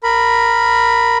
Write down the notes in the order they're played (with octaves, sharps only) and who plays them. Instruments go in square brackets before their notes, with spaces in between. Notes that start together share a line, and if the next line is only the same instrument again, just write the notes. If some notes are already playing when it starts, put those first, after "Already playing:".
[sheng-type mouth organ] A#4 B5